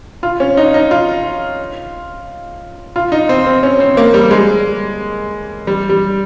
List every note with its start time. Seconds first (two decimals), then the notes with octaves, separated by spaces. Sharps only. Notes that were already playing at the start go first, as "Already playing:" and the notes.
0.23 F4
0.40 C#4
0.57 D#4
0.74 D#4
0.91 F4
2.96 F4
3.12 D#4
3.29 C4
3.46 C4
3.63 C#4
3.80 C4
3.97 A#3
4.14 G3
4.31 G#3
5.67 G3
5.90 G3